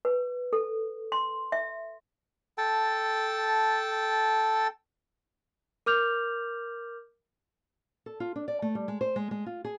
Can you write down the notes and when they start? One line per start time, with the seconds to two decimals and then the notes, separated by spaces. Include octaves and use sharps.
0.05 B4
0.53 A4
1.12 C6
1.52 E5
2.58 A4 G5 A5
5.86 A#4 D6 F6 G6 F7
8.06 A4
8.20 F4
8.36 D4
8.48 D5
8.62 A3
8.75 G3
8.88 G#3
9.01 C5
9.16 G#3
9.31 G#3
9.46 F4
9.65 G#4